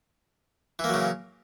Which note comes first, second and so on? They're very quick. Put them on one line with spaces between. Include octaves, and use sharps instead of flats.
E3 A#3 F#3 C#3